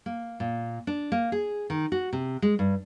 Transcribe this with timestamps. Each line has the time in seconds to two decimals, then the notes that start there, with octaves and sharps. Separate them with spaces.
0.06 A#3
0.40 A#2
0.87 D4
1.12 A#3
1.32 G#4
1.70 D#3
1.92 F#4
2.13 C3
2.42 G#3
2.59 G2